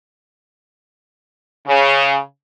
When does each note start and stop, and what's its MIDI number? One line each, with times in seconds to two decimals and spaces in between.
1.66 2.17 49